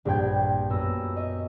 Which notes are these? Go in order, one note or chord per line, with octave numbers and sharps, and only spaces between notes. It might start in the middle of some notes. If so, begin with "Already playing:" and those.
A#1 G2 F3 G5 G#6
F#2 B3 E6 A#6
D#5 E5